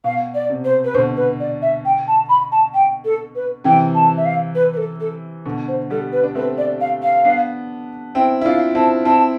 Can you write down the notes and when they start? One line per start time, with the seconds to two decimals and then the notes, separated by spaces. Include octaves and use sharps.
0.04 B2 F5
0.35 D5
0.50 C3
0.65 C5
0.85 B4
0.94 B2 D3 C5
1.17 B4
1.40 D5
1.62 E5
1.85 G5
2.08 A5
2.29 B5
2.52 A5
2.74 G5
3.05 A4
3.35 B4
3.64 C3 E3 G5
3.95 A5
4.17 E5
4.25 F5
4.55 B4
4.73 B4
4.77 A4
5.00 A4
5.45 B2 D3
5.68 C5
5.90 G3 B3 A4
6.13 B4
6.23 D4
6.35 A3 C4 B4
6.58 D5
6.81 F5
7.03 F5
7.25 B3 D4
8.15 C4 E4 G5
8.41 E4
8.45 D4 F4 F5
8.75 C4 E4 A5
9.05 C4 E4 A5